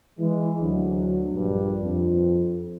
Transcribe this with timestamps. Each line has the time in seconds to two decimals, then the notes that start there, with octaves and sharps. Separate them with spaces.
0.19 E3 G#3
0.60 D2 F#3
1.32 A#1 G2
1.80 F2